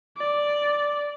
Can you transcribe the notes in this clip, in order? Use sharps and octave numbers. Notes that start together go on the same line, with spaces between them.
D5